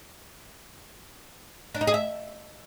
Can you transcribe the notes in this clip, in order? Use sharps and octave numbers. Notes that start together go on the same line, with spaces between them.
D4
D#4
G#4
E5